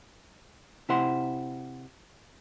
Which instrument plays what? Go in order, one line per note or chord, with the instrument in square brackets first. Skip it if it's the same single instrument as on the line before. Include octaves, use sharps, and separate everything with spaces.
[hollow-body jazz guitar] C3 E4 C5 F#5 C6